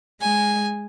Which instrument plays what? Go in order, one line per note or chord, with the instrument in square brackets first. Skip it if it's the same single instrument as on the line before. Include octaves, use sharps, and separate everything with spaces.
[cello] G#3 [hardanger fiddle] G#5